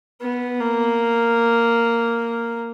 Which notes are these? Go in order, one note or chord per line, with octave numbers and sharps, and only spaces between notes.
B3
A#3